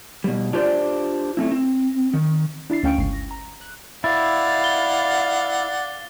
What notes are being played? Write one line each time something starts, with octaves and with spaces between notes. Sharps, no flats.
B2 G3
D4 F4 G4 C5 D5
A3 C4 E4
C4
D#3
D4 E4 A6 C7
D2 C#4 F5 G5 C#6 D7
G1 C#2 C7
A#6
A#5
F#6
E4 D5 F5 F#5 A6
G7